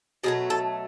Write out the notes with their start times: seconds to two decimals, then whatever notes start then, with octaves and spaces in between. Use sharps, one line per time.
0.24 B2 F#3 A3 G#4
0.50 A4